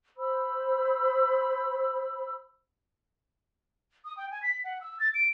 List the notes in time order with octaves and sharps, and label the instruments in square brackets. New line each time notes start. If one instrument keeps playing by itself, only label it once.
[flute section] C5 B5 E6
[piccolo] D#6
G5
G#5
B6
F#5
E6
A6
D7